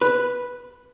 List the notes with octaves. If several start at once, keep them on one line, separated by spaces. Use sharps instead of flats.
B4